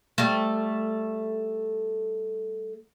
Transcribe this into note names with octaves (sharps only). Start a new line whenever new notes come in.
G3 A3